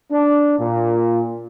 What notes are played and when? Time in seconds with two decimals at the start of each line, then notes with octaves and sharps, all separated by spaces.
0.12 D4
0.59 A#2